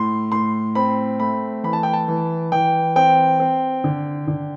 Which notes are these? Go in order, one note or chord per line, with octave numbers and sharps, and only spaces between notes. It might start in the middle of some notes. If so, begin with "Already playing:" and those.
Already playing: A2 C6
A2 C6
C4 B5
A3 B5
E3 B5
A5
G5
A5
E3
E3 G5
C4 G5
C4
D3
D3